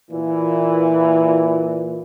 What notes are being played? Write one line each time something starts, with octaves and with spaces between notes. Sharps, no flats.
A#2 E3